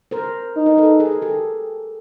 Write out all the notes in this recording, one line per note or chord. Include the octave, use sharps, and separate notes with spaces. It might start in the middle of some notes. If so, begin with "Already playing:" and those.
A#4 C5
D#4
A#4
A4 B4
G#4 A#4
G4 A4